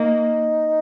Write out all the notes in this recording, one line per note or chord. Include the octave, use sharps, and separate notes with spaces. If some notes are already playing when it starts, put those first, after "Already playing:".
Already playing: A#3 D#4